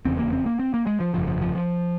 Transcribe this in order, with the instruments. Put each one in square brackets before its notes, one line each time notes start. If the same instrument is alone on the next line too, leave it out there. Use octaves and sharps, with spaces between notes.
[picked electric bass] F1 E2 C#3 C4
A#3
C4
A#3
C4
A#3
G#3
F3
G1 F2 C#3 F3
F3
F3
F3